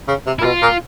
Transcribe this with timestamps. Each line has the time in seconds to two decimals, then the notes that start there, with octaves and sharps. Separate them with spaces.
0.08 C#3
0.27 C3
0.39 A#2 E4
0.44 B2 F4
0.62 A#2